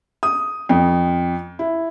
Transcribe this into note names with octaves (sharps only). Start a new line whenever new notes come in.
D#6
F2
E4